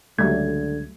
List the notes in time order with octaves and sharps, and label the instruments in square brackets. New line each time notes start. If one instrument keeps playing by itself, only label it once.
[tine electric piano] C#2 G#6 [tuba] D3 [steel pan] F#3 G3 A3